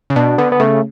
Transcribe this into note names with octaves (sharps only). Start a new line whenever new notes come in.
C#3
B2 D4
D3 B3
B3
C#3 A3